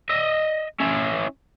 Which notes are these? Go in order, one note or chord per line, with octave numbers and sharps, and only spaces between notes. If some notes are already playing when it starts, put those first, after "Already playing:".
D#5 E5
C#4 E4